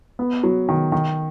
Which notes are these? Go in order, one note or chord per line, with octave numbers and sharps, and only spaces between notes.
B3
F#3
D#3
D#3